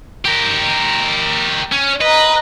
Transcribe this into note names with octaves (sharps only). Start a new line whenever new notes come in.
G4 A#4
C#4
B4 D#5 A#5